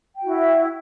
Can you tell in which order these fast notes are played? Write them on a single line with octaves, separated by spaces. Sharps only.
G5 F#4 E4 E5